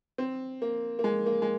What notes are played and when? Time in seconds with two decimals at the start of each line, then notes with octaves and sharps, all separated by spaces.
0.18 C4
0.62 A#3
0.99 A#3
1.04 G#3
1.26 A#3
1.42 G#3